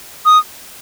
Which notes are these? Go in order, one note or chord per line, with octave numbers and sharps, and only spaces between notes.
D#6